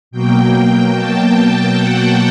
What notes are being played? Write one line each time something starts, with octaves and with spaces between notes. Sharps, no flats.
B2 F#3 A#3 G5
A5
G5
F#5